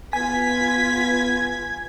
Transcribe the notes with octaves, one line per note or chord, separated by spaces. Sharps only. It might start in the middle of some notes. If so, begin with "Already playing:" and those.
B3 F4 B4 G#5 G#6 B6